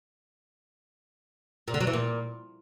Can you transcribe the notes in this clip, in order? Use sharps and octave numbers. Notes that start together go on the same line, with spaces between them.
A#2
D3
F#3
E3
A#2